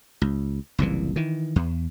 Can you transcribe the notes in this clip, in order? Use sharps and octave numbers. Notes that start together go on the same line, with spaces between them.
C#2
F#1 C2 A#2 E3
D#3 E3
E2